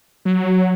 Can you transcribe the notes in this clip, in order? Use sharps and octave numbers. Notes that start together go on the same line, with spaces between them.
F#3